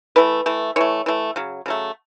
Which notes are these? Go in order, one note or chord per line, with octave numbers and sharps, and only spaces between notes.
E3 A3 B4
E3 A3
E3 A3 C#5
E3 A3
C#3 F#3
C#3 F#3 A3